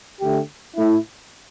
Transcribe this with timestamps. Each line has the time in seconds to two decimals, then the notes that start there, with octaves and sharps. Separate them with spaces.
0.20 D3 A3 G4
0.76 A2 A3 E4